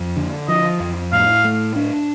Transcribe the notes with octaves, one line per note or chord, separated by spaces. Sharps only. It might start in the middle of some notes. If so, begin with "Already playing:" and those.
Already playing: F2
D3
F3 D#5
F2
A2 F5
A3
D4